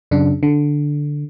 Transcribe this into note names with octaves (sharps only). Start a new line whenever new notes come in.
F#2 C#3 D4
D3